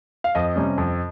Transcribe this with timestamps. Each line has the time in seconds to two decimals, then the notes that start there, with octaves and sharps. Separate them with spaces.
0.24 F5
0.35 F2 D#5
0.56 C3 G3 C#4
0.78 F2